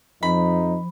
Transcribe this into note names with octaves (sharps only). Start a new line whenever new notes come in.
F2 F3 D#4 B5